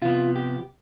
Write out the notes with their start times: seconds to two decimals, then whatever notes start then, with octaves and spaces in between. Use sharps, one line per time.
0.02 C3 F3 B3 F4
0.36 G4